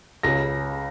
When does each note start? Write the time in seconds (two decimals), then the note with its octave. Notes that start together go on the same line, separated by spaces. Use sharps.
0.23 C#2 C#3 A#6